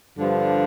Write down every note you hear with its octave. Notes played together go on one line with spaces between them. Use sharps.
G2 D3 F3